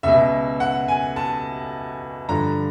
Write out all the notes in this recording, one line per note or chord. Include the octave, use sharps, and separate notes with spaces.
C#2 B2 E5
F#5
G#5
A5
G2 D3 F3 A#5